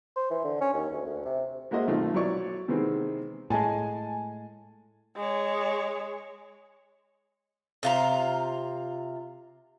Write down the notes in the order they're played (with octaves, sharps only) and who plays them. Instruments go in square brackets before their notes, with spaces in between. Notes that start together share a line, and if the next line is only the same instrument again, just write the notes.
[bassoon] C5
E3
D3
C#4
D#2
D2
D2
C3
[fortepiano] G#3 A#3 F#4 C5 D#5 E5
B1 C3 D#3 A3 F4
F#3 E4 C#5 D5 C#6
C3 D#3 E3 G#3 B3 C4
[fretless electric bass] A2 G#3 [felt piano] G#5 A5
[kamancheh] G#3 C#5
[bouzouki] C3 F4 A#5